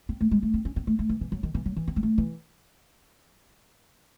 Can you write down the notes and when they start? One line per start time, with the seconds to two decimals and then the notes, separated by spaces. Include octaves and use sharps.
0.09 C4
0.21 A3
0.31 G#3
0.42 A3
0.54 C4
0.65 C#4
0.76 C4
0.87 A3
0.99 A3
1.09 E3
1.21 E3
1.32 F#3
1.43 D#3
1.54 E3
1.66 F#3
1.76 E3
1.88 C4
1.96 G#3
2.03 A3
2.18 E3